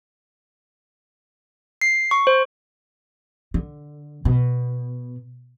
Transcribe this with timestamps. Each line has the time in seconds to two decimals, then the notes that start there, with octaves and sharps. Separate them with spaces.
1.81 C7
2.11 C#6
2.27 C5
3.54 D3
4.25 B2